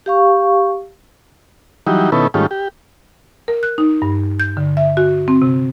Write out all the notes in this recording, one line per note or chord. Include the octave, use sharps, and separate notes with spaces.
G4 F5 C#6
E3 F#3 G3 D#4
B2 D#3 B3 C#4 E4 A4
G#2 D#3 G3 A3 C#4 F4
G4
A#4
F#6
D#4
G2
G6
D3
E5
F#4
C4
C3